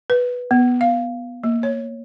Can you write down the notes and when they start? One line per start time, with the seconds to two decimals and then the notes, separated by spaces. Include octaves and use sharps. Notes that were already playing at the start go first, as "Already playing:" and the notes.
0.10 B4
0.51 B3
0.81 F5
1.44 A#3
1.63 C#5